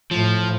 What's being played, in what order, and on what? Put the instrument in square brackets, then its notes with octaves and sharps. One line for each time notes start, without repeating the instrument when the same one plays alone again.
[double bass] A2 [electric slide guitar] F3